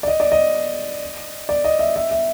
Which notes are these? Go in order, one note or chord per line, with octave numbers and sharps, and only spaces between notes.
D5
D#5
D5
D#5
D5
D#5
E5
E5
E5